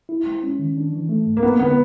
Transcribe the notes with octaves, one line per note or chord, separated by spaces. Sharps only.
E4
G#3
C#4
D#3
D4
E3
A3
G#2
A#3
G#3 B3
D3 B3